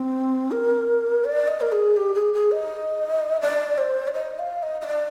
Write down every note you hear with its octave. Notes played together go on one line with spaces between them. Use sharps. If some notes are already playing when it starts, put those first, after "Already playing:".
Already playing: C4
A#4
D5
D#5
A#4
G#4
G4
G#4
G#4
D#5
D5
C5
D5
D#5
F5
D#5
D#5
D5